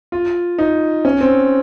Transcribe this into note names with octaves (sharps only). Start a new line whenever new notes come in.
F4
D#4
C#4
C4